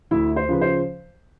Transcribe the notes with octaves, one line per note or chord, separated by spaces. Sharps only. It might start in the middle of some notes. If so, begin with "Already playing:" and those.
D2 E4 E5
C5
C#3 F3 B4
C5